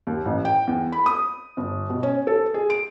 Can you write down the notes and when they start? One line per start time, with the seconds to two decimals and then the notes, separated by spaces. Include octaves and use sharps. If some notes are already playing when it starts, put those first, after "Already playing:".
0.07 D#2
0.25 A1
0.45 G5
0.67 E2
0.92 B5
1.06 D#6
1.57 G1
1.90 B2
2.03 C#4
2.27 A4
2.54 G#4
2.70 D7